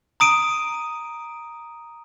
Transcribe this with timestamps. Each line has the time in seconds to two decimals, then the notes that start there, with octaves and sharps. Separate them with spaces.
0.20 A#5 D#6 D7 D#7